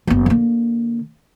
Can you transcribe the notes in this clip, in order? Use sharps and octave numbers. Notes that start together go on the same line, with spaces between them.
F#1 B3
D3 A#3